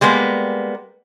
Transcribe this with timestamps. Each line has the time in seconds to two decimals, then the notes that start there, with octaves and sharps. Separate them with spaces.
0.01 G3 G#3 A#3 B3